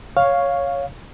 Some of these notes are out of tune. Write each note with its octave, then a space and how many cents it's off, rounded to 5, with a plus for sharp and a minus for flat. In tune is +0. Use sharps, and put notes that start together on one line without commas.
C#5 +0 F5 +5 C#6 +0